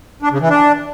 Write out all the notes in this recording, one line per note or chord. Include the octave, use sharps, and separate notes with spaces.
D4
C#3
E3
D4